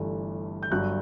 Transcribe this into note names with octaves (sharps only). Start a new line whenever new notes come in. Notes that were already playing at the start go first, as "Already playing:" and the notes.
Already playing: G1 G2 E3 A3
G6
G1 G2 F#3 F#6